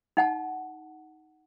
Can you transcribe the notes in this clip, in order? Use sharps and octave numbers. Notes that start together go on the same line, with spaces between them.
D#4 F#5 A5